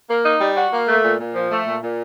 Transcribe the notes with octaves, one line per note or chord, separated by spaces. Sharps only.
A#3
D#4
G3
F#4
A#3
A3
A#2
A#2
F3
A3
A#2
A#2